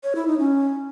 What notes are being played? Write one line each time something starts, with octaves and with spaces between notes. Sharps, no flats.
C#5
E4
D#4
C#4